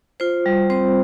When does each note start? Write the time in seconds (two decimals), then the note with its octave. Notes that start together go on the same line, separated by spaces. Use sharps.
0.20 F4 C5
0.46 G3
0.70 C4 C5